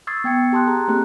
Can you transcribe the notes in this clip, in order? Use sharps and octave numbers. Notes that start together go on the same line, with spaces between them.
C#6 D#6 E6 G#6 A6 C7
B3 G5 G#6 C#7
G4 A5 C6 D#6 F#6
G#4 A#5
A3 A#3 C4 E4 G4 F#6